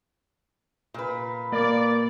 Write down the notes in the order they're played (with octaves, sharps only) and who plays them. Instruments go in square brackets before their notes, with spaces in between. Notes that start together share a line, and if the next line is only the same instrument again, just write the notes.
[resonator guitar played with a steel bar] A#2 B4
[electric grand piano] A#3 [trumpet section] D5